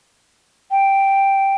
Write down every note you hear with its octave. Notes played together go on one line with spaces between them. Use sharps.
G5